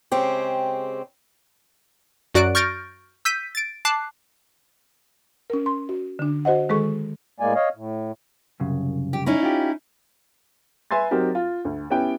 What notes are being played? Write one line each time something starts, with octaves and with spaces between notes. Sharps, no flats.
C#3 G#3 C4 G4
F#2 F#4 D5 F#6 D7
C#6 F6 G6 A6 A#6 D7
E6 G6 B6 D#7
A6 D7
A5 D6 F#6 C7
C#4 A#4
C6
F#4
D3 D4
F#4 C5 D#5 F#5
D#3 G#3 G#4 A4 C#6
A2 G#3 A#3 D5 G#5
C#5 D#5 F5
A2
C2 F#2 C#3
G4
C#4 D#4 E4
F4 G4
B4 E5 G#5 C6 A6
F#3 C4 D#4 F#4 G4 A#4
F4
D2
B3 C#4 E4 G4 B4 G5